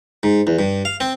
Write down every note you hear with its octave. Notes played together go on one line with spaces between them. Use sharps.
G#2
E2
G2
F5
C4